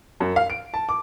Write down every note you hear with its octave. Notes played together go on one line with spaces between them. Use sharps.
F#2
F5
D7
A5
D6